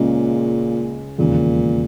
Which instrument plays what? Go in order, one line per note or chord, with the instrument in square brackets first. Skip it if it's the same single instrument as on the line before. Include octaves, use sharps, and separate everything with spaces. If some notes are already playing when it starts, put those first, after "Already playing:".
Already playing: [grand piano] C#2 C#3 G#3 C#4 [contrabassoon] A#2
[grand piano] E1 D#2 C#3 [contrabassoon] A#2